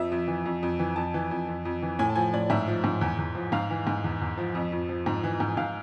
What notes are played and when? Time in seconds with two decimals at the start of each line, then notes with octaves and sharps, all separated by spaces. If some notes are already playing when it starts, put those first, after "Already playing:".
Already playing: F2 F3 E5
0.12 F2
0.28 E3
0.45 F2
0.63 F2
0.79 E3
0.96 F2 A5
1.14 E3
1.31 F2
1.48 F2
1.65 F2
1.82 E3
1.99 A2 G#5
2.09 A5
2.15 F3 G#5
2.34 A2 D5
2.50 G#2 E5
2.68 F3
2.84 G#2
3.01 E2
3.18 E2
3.35 F3
3.52 G#2 F5
3.70 E3
3.87 G#2
4.04 E2
4.21 E2
4.38 F3
4.55 F2
4.72 F2
4.89 F3
5.06 G#2
5.24 E3
5.40 G#2
5.57 G#2 F5